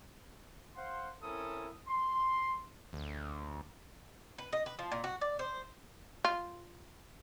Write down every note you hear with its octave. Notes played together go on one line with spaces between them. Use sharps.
C5 F5 F#5 C6
C4 C#4 E4 A4 A#4 D#6
C6
D2
B4
D#5
B4
F3
A#2
F#4
D5
C5
F4